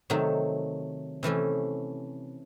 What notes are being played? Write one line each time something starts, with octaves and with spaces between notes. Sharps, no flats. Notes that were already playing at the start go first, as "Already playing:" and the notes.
C3 D#3 F#3 A3
C3 E3 A3 C#4